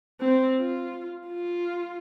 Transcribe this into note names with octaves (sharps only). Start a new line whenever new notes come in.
C4
F4
F4